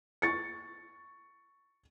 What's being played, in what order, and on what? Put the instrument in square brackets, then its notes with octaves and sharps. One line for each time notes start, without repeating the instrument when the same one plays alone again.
[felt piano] C#6 A6 C#7